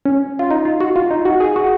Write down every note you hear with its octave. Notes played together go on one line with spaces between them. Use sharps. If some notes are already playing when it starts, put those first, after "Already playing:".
C#4
F4
D#4
F4
F#4
F4
D#4
F#4
G#4
F#4